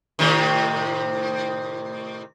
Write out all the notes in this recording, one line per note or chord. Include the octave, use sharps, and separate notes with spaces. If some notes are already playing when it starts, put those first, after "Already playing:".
A2 C3 D#3